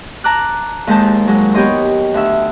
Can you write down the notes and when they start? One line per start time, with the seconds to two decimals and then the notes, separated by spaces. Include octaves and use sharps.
0.24 A5 A#5 D6 F#6
0.87 D#2 G#3 C5 A5
1.27 F#3 G#3
1.54 B3 G4 C#5 D#5 C6
2.14 D2 E5